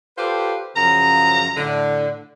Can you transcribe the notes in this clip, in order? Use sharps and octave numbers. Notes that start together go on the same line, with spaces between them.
F4 G4 A4 B4 C5 D5
F#2 C#3 F3 A#5
A2 D3